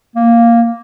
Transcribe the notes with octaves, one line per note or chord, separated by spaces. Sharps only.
A#3